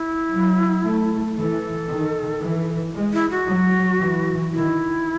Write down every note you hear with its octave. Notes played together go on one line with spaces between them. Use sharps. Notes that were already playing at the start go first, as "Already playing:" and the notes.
Already playing: E4
F#3
A3
E3 A4
D#3
E3
G#3
E4
F#4
F#3
E3
D#3 E4